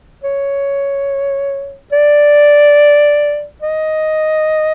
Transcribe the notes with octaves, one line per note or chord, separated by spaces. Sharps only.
C#5
D5
D#5